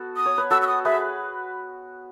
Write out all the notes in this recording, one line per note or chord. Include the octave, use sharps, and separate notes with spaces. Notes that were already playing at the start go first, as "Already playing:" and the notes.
Already playing: B3 F#4 A4
D#6
C#5
B4
F#4 A4 E6
E6
D#6
G#4 B4 E5